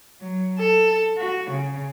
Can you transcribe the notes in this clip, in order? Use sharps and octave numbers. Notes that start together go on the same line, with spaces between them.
F#3
A4
F#4
C#3